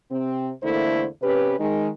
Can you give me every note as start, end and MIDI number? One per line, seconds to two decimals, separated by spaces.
0.11 0.52 48
0.11 0.52 60
0.63 1.07 40
0.63 1.07 50
0.63 1.07 57
0.63 1.07 58
0.63 1.07 64
0.63 1.07 72
1.22 1.57 48
1.22 1.57 61
1.22 1.57 67
1.22 1.57 71
1.59 1.89 51
1.59 1.89 56